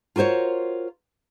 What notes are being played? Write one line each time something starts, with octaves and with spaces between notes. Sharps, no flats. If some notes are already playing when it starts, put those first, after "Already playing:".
F4 F#4 A#4 C5 C#5